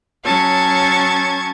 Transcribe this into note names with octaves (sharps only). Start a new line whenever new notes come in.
F#3 C#4 A5 C#6 G#6